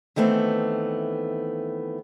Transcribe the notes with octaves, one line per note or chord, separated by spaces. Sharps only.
D#3 E3 A3 B3 C4